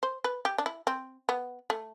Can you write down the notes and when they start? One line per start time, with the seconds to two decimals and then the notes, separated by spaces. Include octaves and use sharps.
0.03 C5
0.24 B4
0.45 G4
0.58 D4
0.66 E4
0.87 C4
1.29 B3
1.70 A3